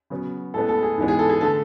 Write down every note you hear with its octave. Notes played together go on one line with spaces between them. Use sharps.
C#3 F#3 B3
A2 G#3 B3 A4
A4
G#4
G#2 E3 G#3 B3
G#4
A4
G#4
D3 A3 A4